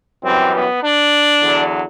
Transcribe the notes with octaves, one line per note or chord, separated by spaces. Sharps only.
F#2 E3 G3 C4
B3
D4
E2 D3 F#3